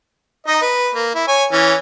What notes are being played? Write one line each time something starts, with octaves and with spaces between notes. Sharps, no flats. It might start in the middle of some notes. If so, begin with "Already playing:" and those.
D#4 D#5
B4
A#3
E4
C#5 G#5
E3 C#4